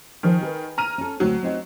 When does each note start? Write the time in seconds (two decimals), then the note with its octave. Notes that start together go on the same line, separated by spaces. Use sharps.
0.23 D#3 F3 G#4 C5
0.41 G#4 A4 B4
0.78 A#5 F6 D#7
0.98 C#4 A4
1.20 D2 F#3 A3 C4
1.43 C4 D#4 F#4